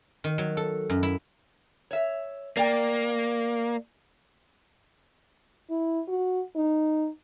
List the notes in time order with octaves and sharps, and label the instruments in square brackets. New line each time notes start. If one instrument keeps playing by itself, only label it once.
[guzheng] D#3
F#3
A4
F#2
E4
[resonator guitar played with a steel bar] C#5 E5
[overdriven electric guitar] A#3 [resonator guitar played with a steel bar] D5 G5
[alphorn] E4
F#4
D#4